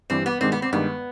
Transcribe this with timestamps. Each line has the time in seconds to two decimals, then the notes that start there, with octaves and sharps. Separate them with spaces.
0.10 G2 E3 G3 C4
0.26 B3
0.41 G2 D#3 G#3 C4
0.52 B3
0.62 C4
0.73 G2 D#3 G#3 B3